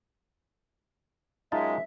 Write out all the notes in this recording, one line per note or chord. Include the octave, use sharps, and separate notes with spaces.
F#2 G#3 D#4 F4 E5 A5